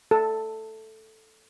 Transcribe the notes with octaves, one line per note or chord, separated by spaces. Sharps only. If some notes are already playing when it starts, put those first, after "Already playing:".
A4